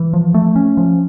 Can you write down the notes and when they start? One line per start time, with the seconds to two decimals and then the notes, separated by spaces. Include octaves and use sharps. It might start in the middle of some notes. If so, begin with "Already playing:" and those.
Already playing: E3
0.13 F3
0.34 A3
0.56 C#4
0.77 F3